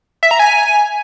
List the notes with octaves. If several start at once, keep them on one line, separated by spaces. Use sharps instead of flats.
E5
A#5
G#5